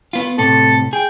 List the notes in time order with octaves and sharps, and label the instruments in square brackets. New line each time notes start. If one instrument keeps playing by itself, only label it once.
[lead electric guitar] B3 F4
[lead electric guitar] A2 C3 [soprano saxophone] A4
[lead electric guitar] G#4 [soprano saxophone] G5